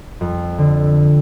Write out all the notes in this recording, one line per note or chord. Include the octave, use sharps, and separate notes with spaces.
F2
D3